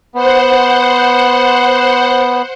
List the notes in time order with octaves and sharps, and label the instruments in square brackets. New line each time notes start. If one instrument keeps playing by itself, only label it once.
[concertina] B3 [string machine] C5 F#5